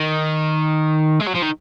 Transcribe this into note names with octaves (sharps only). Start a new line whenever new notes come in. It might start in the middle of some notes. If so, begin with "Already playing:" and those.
Already playing: D#3
G#3
F#3
F3
D#3